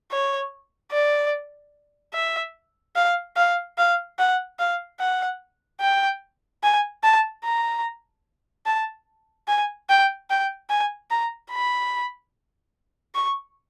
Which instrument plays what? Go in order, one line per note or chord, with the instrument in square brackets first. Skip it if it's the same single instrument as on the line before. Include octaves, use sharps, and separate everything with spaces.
[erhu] C#5
D5
E5
F5
F5
F5
F#5
F5
F#5
G5
G#5
A5
A#5
A5
G#5
G5
G5
G#5
A#5
B5
C#6